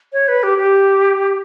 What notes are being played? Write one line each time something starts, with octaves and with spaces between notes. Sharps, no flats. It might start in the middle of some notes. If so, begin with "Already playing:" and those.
C#5
B4
G4
G4